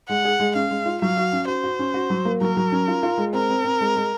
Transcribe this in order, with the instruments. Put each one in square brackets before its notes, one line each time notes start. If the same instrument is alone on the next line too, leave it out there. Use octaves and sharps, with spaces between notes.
[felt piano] G#3 [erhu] F#5
[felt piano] G#4
G#3
[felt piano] C#4 [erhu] F5
[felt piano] G#3
F4
[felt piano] F#3 [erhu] F5
[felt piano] F#4
C#4
[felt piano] F#4 [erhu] C5
[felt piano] F#4
C#4
F#4
F#3
A#3
[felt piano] F#3 [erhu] A#4
[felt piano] F#3
C#4
F4
F4
G#3
[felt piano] C4 [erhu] A#4
[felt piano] C4
C4
G#3
G#3